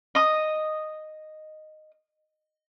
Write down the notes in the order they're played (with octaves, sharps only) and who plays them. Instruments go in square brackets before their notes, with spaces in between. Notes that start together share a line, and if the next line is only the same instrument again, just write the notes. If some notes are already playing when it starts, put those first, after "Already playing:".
[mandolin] D#5 D#6